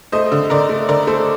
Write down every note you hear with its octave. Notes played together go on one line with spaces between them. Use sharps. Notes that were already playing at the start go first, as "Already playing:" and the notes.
A3 C5 D#5
D3
D3 A#4 D5
A3
D3 A#4 D5
A3 A4 C5